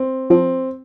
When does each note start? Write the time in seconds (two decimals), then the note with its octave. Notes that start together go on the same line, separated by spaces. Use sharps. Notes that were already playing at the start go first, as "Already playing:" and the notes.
Already playing: C4
0.30 F3 C4